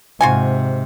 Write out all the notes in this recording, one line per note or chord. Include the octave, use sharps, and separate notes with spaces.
G#2 C3 F4 F#4 G#5